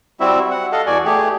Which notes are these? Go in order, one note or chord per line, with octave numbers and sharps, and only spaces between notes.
G3 C4 E4 F#4 E5
F#5
A4 D#5 F5 F#5
E2 F#4 D5 G#5
A3 G4 G#4